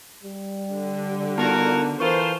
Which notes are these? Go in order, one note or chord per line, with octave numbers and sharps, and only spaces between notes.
G3
D3
B3 D#4 F4 F#4 A#4 A5
E3 F4 A4 A#4 C5 C#6